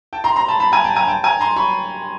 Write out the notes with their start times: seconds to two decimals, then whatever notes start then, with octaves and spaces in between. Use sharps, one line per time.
0.13 G5 A5
0.24 A#5 C6
0.36 A#5 C6
0.48 A5 B5
0.60 A5 B5
0.72 G#5 A#5
0.84 G5 A5
0.96 G#5 A#5
1.08 G5 A5
1.24 G#5 A#5
1.40 A#5 C6
1.56 B5 C#6